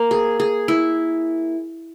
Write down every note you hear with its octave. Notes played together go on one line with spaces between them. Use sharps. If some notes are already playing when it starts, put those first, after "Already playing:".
Already playing: A#3
G#4
G#4
E4